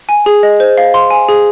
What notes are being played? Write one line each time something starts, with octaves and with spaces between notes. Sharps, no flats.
G#5
G#4
D#5
C5
F5
C6
G#5
G#4